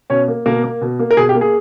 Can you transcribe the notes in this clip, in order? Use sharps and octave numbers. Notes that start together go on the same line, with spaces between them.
B2 C#4 C#5
A#3
B2 A#3 A#4
A#3
B2
A#3
A#4
B2 G#4
G4
A#3
G#4